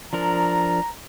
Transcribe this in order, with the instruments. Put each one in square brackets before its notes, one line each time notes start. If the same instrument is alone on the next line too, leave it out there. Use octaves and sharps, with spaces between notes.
[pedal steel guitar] F3 D4 A#4 [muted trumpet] A#5